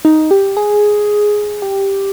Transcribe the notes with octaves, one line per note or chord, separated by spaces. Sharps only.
D#4
G4
G#4
G4